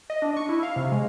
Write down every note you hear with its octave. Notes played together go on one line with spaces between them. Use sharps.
D#5
D4
C#6
E4
F5
C3
G#3